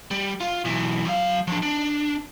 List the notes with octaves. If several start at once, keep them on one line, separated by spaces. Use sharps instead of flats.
G3
F4
B1 E3
F#3 F5
F3 D4
D4